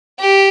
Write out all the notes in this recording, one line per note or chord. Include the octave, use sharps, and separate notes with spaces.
G4